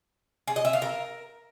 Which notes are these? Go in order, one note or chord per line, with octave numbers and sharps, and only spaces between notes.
G#4
D#5
E5
F5
A#4